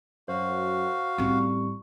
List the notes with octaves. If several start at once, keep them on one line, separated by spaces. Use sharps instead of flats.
F#2 F#4 C5 F5
A1 G3 C4 C#6